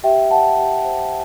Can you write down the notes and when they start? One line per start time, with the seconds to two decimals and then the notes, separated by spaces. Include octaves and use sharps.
0.03 G4 E5 G5
0.31 C5 F#5 A5
0.58 G4
0.85 C5